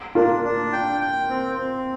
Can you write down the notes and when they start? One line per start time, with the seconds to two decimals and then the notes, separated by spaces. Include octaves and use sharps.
0.15 D4 F4 A#4
0.44 D4
0.73 G5
1.01 G5
1.30 C4
1.58 C4